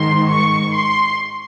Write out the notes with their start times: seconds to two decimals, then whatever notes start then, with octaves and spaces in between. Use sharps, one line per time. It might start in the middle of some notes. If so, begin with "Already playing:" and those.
Already playing: G#2 D#3 C6
0.30 C#6
0.75 C6